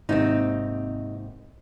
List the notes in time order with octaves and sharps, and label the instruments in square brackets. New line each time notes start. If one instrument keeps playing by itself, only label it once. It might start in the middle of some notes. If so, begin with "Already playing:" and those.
[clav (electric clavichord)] G#1 D#2 C3 [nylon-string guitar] C4 D#4